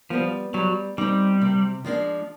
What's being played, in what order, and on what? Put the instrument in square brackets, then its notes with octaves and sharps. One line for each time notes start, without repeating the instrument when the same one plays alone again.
[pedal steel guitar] F3 [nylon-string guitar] G3 B3
[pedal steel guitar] F#3 [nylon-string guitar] G3
[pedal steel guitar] G3 [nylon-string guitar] C4 D#4
[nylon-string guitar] C3
F3 G#3 B3 D4